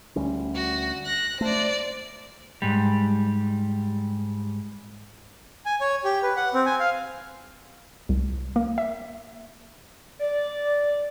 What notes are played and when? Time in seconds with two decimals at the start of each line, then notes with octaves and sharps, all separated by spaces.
0.16 D2 G3 C#4
0.54 F#4
1.05 F#6 A#6
1.41 A3 C5 D5
2.62 G#2 G3
5.66 G#5
5.81 C#5
6.04 G4
6.23 B4
6.37 F#5
6.54 C4
6.66 G#5
6.80 F5
8.09 C2
8.56 A#3
8.78 E5
10.20 D5